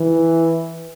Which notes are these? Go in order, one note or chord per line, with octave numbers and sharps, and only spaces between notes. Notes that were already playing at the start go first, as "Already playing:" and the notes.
Already playing: E3